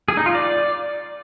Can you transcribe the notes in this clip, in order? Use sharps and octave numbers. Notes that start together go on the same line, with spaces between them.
G#4
D#4
F4
D5